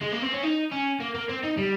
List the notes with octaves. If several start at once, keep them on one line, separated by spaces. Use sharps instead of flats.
G#3
A#3
C4
C#4
D#4
C#4
A#3
A#3
C4
D#4
G3